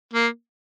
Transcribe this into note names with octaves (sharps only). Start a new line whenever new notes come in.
A#3